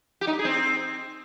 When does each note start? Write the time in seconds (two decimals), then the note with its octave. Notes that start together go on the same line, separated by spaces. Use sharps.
0.21 G4
0.27 D#4
0.33 G4
0.39 G#4
0.45 C4